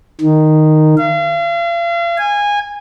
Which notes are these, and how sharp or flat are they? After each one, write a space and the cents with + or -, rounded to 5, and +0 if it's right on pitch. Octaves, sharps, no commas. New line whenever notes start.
D#3 -5
F5 -40
G#5 -20